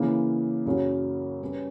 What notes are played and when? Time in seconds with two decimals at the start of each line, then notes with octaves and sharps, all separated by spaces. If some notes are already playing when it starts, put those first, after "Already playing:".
Already playing: C#3 E3 A#3
0.66 F#2 C#3 F#3
1.41 G3 C#4 G4 B4